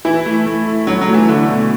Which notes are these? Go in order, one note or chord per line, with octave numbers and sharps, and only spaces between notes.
E3 E4
A3
A3
E4
F#3 E4
F#3
A3
E3
D3 A3
B2